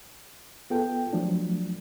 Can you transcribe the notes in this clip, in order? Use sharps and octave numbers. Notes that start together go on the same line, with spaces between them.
B3 F4 G#4 A4 G5
F3 F#3 A3 D4